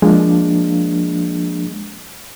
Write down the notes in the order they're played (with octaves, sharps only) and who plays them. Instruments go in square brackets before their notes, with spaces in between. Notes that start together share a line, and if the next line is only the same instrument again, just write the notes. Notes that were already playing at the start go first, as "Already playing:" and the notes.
[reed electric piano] F3 A#3 D4 [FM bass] G#3